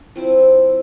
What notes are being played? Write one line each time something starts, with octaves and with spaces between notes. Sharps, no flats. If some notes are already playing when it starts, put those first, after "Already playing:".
Already playing: D4
F3 C4 E4